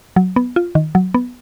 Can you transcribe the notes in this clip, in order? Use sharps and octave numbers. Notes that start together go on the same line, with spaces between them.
F#3
B3
F4
D#3
F#3
B3